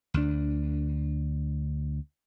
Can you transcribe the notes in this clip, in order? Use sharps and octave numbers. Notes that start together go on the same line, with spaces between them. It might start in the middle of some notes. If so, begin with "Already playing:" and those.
D2 D4